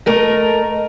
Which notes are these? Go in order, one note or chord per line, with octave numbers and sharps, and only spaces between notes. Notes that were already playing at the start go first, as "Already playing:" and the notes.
A3 A#4 D#5